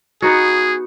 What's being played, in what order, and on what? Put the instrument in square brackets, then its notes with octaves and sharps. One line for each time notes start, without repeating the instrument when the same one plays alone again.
[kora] B3 D#4 F#4 [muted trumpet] G#4